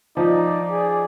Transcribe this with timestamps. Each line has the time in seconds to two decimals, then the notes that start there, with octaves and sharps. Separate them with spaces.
0.17 F3 D#4 D5
0.70 G#4